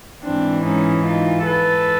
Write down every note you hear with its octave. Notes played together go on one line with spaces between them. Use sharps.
G#2 E3 C4 D4
C#4 D#4
D#4 F4
A4 B4